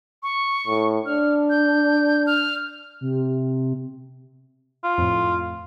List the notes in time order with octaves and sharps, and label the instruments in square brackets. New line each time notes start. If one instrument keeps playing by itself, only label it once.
[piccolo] C#6
[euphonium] A2
[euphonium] D4 [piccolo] F6
[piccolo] G6
F6
[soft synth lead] C3
[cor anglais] F4
[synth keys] F2 A2